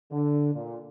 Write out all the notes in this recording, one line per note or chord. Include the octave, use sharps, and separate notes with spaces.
D3
A#2